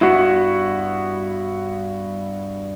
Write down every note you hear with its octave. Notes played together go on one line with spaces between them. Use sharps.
G2 B3 E4 F#4